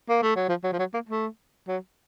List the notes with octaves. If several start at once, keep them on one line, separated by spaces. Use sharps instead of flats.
A#3
A3
F#3
F3
F#3
F3
F#3
A#3
A3
F#3